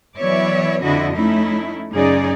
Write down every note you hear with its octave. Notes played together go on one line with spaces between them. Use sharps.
E3 F#3 B3 C#5 D5 E5
F2 D3 D4 E4 F#4 D#5
A3 C#4 D#4 E4
F#2 C#3 D#4 G#4 D5